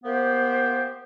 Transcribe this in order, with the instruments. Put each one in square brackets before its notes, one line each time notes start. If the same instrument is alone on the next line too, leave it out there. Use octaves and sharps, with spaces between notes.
[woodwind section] A#3 B3 G4 C5